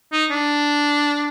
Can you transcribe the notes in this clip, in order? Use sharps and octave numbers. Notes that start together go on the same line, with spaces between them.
D#4
D4